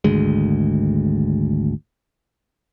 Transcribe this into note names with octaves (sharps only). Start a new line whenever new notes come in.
G#1 D2 G#3